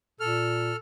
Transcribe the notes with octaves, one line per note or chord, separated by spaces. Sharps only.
A#2 A4 F6